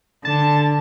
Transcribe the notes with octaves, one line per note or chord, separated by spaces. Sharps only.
D3 A5